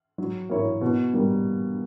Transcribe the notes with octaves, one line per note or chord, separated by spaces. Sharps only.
F#3
A#3 E4 A#4 C#5
B2
G3 A#3